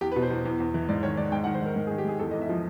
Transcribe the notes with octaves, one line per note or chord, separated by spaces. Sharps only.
E2 G4
B4
B2
C5
E2
E2
E2
E3
G#2 D5
D#3 C#5
G#2 D5
G#2 G5
D#3 F#5
C5
G#2 A#4
G#2 A#4
G#4
D#3
G4
G#2 G#4
E2 A4
E2 D#5
E5
F3